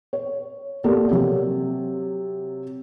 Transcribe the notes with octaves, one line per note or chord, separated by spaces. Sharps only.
C#5
A#3 B3 G4 A4 A#4 D5
C3 F#3